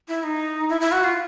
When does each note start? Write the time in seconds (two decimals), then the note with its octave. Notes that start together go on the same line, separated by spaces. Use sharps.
0.08 E4
0.23 D#4
0.69 E4
0.81 E4
0.92 F#4
1.04 F4